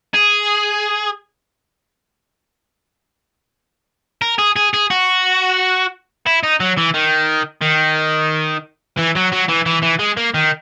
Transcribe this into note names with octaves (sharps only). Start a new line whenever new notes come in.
G#4
A#4
G#4
G#4
G#4
F#4
E4
D#4
F#3
E3
D#3
D#3
E3
F#3
F#3
E3
E3
E3
G#3
A#3
D#3